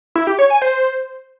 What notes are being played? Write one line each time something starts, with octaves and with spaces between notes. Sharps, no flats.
E4
G4
C#5
G#5
C5